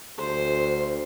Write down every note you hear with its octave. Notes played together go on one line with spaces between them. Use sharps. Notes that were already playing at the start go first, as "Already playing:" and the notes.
D2 C5